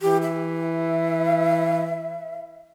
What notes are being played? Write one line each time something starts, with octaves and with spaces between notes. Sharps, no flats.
E3 G4
E5